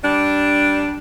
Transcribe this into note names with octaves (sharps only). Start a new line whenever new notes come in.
G3 D4